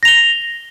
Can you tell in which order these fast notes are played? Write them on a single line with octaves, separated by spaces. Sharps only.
A#6 F7 G7